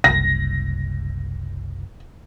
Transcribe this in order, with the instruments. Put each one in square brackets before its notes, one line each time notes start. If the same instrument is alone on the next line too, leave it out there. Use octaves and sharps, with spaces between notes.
[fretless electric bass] F#1 C2 [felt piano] A#6